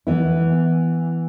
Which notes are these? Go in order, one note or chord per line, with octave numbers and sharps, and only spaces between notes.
E3 B3 E4